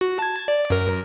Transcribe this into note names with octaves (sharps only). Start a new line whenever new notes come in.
F#4
A5 G#6
D5
F#2 A#4